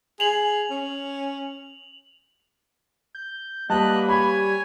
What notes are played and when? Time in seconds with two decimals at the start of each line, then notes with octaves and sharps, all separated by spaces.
0.20 G#4 F7 F#7
0.70 C#4
3.15 G6
3.70 G3 A#3 B4 D#5 F#5 A5 F#6
4.09 C#5 G#5 B5